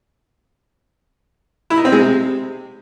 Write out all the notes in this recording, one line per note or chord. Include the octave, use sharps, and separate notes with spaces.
E4
D#4
C4
G#3
C3